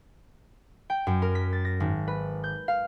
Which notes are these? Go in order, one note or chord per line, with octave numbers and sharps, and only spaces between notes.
G5
F#2
A#4
B6
A6
A#6
G#1
B4
G6
F5